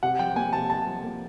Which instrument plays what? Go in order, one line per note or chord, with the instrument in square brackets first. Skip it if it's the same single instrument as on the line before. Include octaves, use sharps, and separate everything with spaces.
[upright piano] C3 [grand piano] F#5
[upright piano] F3 [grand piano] G5
[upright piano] A#3 [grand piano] G#5
[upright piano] C3 [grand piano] A5
[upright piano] C3 [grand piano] A5
[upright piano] F3
A#3